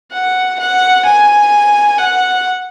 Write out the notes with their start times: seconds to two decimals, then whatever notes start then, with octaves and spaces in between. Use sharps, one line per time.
0.12 F#5
0.59 F#5
1.05 G#5
1.98 F#5